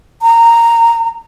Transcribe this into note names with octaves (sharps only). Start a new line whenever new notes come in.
A#5